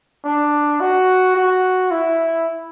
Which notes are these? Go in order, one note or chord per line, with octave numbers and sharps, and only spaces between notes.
D4
F#4
F#4
E4